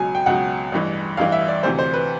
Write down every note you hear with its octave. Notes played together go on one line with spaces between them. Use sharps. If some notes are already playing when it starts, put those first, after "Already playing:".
Already playing: C#2 B2 F#3 G#5
G5
C#2 B2 F#3 F#5
A1 G2 E3
A1 G2 E3 F5
E5
D5
D2 C3 E3 C5
C5
B4